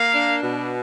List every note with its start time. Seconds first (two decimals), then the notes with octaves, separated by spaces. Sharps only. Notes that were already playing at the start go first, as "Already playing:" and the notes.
Already playing: A#3 F5
0.14 D4
0.43 B2